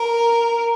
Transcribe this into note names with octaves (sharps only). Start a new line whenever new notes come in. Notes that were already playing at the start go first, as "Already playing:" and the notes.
Already playing: A#4